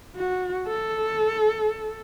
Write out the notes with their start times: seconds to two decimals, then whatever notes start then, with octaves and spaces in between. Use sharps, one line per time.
0.16 F#4
0.68 A4